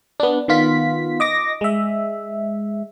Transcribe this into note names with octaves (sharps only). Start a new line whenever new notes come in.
B3 D4
D#3 B3 F4 B6
D#5 D6 A#6
G#3 E5